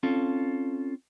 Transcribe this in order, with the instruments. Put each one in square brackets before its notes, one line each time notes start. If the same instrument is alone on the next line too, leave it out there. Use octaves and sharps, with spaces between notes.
[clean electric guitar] C4 C#4 F4 A4